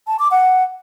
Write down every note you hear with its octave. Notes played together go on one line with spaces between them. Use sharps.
A5
D6
F#5